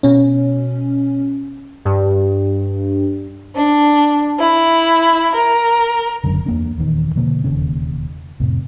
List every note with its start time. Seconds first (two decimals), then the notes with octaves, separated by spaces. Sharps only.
0.03 B2 C#4
1.85 G2
3.55 D4
4.40 E4
5.35 A#4
6.24 F#1 C#2 F#2 D3
6.46 E2 A#3 D4
6.78 D#1 E2 D#3
7.16 B2 D3 F3 A#3
7.44 E1 D#2 C#3 C#4
8.40 F2 A2 C3